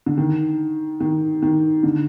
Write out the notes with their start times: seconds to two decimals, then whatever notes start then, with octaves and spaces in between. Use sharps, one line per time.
0.06 D3
0.17 D#3
1.00 D#3
1.42 D#3
1.83 D3